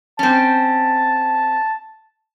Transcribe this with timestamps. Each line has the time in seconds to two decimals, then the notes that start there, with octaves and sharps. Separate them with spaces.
0.19 C4 C#4 A5